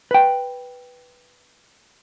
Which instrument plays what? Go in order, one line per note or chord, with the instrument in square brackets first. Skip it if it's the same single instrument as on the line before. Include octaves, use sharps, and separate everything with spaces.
[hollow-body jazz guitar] B4 G5